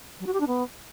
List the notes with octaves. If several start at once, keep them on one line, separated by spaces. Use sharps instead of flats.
F#3
F#4
G4
D4
B3